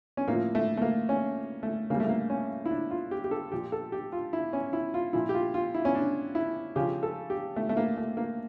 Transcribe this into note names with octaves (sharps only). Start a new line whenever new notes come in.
C#4
A2 F3 A#3
A3
A3
A#3
C#4
A3
C#3 G3 A#3
A3
A#3
C#4
E4
D4
F4
G4
G4
A4
A#2 F3 G4
A4
G4
F4
E4
C#4
E4
F4
A#2 F3 E4
G4
F4
F4
E4
C#4
D4
E4
C#3 F3 G4
A4
G4
A3
A3
A#3
A3
A#3